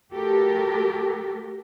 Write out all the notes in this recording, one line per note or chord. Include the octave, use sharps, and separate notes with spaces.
A3 F#4 G4 A4 A#4